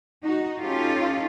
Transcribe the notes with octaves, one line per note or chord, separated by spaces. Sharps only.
D#4 F#4
C#4 D#4 F4 G4 A4